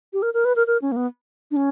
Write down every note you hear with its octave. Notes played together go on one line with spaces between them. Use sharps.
G4
A#4
A#4
B4
A#4
A#4
C#4
A#3
B3
D4
C#4